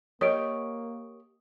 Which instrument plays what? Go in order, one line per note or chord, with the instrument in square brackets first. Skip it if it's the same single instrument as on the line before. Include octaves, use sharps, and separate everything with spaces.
[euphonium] A#3 [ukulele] G4 C#5 [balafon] A#4 D#5 [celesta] D#6 D7